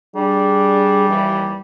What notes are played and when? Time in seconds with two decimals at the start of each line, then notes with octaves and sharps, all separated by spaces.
0.16 G3 D4 G#4
1.08 D#2 E3